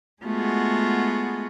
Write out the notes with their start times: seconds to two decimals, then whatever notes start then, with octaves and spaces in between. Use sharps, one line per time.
0.23 G#3 A3 B3 F4 F#4 G#4